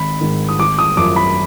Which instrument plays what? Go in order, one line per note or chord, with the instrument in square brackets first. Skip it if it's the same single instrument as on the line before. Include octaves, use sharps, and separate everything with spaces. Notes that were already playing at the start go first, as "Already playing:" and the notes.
Already playing: [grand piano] G#1 B5
G#2 D#3
D#6
G#1 D6
D#6
F#2 F3 D6
B5